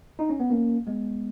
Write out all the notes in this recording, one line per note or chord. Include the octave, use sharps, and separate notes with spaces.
D#4
C#4
B3
A#3 C#4
G#3 B3